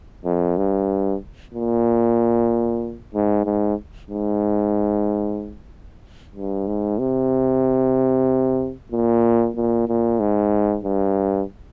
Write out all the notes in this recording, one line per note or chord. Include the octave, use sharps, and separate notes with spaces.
F2
G2
A#2
G#2
G#2
G#2
G2
G#2
C3
A#2
A#2
A#2
G#2
G2